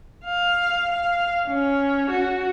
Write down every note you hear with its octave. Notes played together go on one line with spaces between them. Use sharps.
F5
F5
C#4
F#4